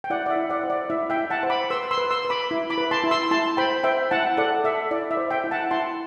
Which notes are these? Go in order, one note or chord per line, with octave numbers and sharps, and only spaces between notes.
G5
E4 D5 F#5
D5
E5
E4
D5 F#5
C5
D5
E4 E5
E5 G5
E4
F#5 A5
C5
B5 D6
B4 C6 E6
C6 E6
B4
C6 E6
B4
B5 D6
E4
B5 D6
B4
A5 C6
E4
C6 E6
E4 A5 C6
C5 G5 B5
C5 E5 G5
E4 F#5 A5
A4 D5 F#5
A4 E5
E4 D5
E5
C5
E5 G5
E4
F#5 A5
E4 A5 C6